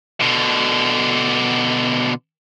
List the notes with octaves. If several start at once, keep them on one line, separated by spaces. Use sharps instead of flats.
B2 D3